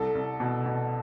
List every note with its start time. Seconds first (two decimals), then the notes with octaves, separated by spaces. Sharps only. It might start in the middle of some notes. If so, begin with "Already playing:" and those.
Already playing: C2 A4
0.15 C2
0.40 B2
0.66 B2